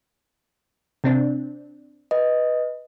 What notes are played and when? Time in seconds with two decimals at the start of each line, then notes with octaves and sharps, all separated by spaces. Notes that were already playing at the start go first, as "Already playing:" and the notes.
1.04 C3 C4 D4
2.11 B4 D#5